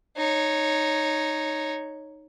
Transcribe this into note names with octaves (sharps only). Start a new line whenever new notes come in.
D#4 C#5